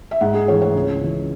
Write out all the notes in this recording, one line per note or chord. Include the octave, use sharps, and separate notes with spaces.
E5
G#2 F#5
G#4
E3 A3 C#5
C#5
C#2
C#3 E3